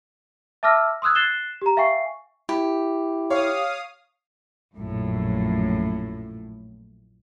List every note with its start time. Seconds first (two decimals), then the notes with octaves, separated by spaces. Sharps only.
0.63 E5 A5 D6 E6 F6 A#6
1.02 C6 D#6 E6 F#6 G#6
1.15 F#6 A6 C7 E7 G7
1.62 G4 A#5
1.77 E5 F5 G5 G#5 C#6 C7
2.49 E4 G4
3.30 C#5 F5 C#6 D#6
4.77 A#1 F#2 A2